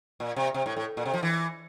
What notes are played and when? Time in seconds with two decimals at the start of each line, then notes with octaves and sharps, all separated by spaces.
0.20 A#2
0.36 C3
0.54 C3
0.66 A2
0.77 A2
0.97 A#2
1.06 C3
1.13 F3
1.23 E3